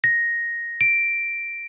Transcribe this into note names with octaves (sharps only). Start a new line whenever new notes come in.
A#6
D7